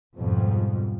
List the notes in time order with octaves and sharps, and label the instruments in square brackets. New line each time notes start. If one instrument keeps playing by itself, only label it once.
[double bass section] F2 G#2 B2 F3 G3